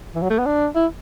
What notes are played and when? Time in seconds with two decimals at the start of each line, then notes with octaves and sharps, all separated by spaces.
0.15 E3
0.22 F#3
0.30 A3
0.38 B3
0.46 D4
0.76 E4